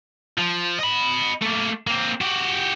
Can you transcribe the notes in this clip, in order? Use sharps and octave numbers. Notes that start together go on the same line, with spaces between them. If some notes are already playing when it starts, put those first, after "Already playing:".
F3
D#5 B5
A3 A#3
A#3 C4
F#4 G4